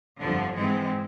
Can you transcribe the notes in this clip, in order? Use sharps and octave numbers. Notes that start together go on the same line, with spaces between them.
G1 F2 D3 F3
G#2 E3 G#3 C4